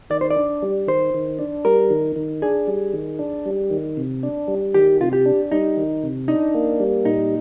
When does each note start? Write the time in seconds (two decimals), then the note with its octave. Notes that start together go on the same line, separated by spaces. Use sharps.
0.10 D#3 D5
0.21 C5
0.30 D5
0.36 D4
0.62 G3
0.87 D#3 C5
1.14 D#3
1.39 D4
1.65 G3 A#4
1.90 D#3
2.16 D#3
2.42 D4 G#4
2.67 G3
2.93 D#3
3.19 D4
3.46 G3
3.70 D#3
3.97 C3
4.23 D4
4.48 G3
4.74 D#3 G4
5.00 C3 F4
5.13 G4
5.25 D4
5.51 G3 D#4
5.77 D#3
6.03 C3
6.28 D4 D#4
6.55 A#3
6.80 G3
7.05 A#2 D#4